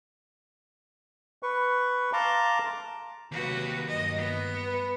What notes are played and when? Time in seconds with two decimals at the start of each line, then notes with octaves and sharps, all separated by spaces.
1.43 B4 C#6
2.13 F5 A5 A#5 C6 D6
3.32 D#2 C3 F#3 F#4 B4
3.88 G2 D#5
4.17 B3
4.65 B4